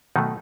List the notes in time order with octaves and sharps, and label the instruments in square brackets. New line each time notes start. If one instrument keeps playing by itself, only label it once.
[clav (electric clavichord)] B2 D#3 F#3 A3 D#4